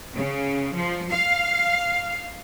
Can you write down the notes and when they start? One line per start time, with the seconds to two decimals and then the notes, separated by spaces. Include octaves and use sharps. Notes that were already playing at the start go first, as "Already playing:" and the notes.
0.15 C#3
0.74 F3
1.11 F5